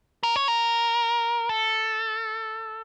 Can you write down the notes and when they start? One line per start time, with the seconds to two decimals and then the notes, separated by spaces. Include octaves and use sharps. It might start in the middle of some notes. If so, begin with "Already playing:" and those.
0.23 A#4
0.36 C#5
0.48 A#4
1.49 A4